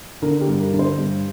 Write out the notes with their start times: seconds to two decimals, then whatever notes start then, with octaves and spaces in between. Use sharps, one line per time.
0.22 D3 A#4
0.41 G4
0.48 G2
0.60 A#4
0.73 D3
0.79 C5
0.98 G2